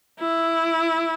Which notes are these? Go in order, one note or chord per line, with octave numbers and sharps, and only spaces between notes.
E4